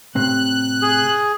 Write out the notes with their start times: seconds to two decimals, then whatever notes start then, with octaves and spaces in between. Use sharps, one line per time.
0.15 A2 C3 F#6
0.82 G#4